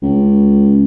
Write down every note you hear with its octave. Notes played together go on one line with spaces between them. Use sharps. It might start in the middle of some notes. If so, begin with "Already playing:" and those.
C#2